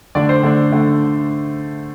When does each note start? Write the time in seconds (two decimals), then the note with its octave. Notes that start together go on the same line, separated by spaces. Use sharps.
0.15 D3 A3 D4 D5
0.29 C5
0.43 D3 A3 D4
0.72 D3 A3 D4